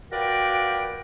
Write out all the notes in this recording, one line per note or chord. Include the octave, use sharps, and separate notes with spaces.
F4 F#4 A#4 B4 D5 G5